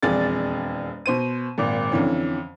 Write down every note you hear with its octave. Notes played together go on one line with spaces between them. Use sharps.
E1 F2 G#4 D5 A6
B2 C5 D#7
G#1 A#2
F2 D3 E3 C#4